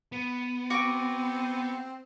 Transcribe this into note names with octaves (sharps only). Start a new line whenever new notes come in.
B3
C4 F#4 D6 D7